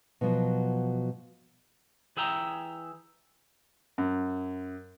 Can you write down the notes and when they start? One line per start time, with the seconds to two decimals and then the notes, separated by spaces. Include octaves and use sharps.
0.21 B2 F3 F#3
2.17 E3 G#4 E5 G5 A#5
3.98 F#2